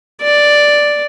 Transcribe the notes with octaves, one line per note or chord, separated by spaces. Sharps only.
D5